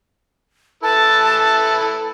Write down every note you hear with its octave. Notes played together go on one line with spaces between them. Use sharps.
E4 A4 B4 A5